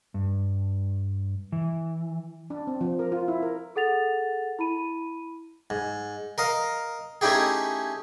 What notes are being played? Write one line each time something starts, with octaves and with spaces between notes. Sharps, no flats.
G2
E3
D4
C4
F3
A#4
F4
E4
A#4
G#4 A4 F#5 A6 F7
E4 B5 D#7
G#2
A#4 D#5 F5
A3 C#4 D#4 E4 G4 G#4